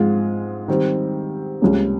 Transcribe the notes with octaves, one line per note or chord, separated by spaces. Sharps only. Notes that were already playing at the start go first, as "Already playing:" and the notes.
Already playing: G#2 F3 G#3 C4 F4
D#3 G3 C4
C#2 C3 G3 A#3 C#4